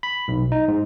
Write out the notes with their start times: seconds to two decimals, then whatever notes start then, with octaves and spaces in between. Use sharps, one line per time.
0.03 B5
0.28 B1
0.52 D#4
0.68 G#2